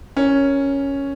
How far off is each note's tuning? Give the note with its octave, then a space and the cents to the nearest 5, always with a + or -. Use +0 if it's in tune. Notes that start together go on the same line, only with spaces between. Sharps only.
C#4 +0 A#4 +0